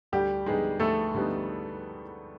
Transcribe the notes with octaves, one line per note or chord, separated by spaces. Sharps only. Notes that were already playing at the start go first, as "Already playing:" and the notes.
D2 G3 G4
D3 G3 G#3 B3 D#4 G#4
D2 A3 A4
D3 G3 B3 D#4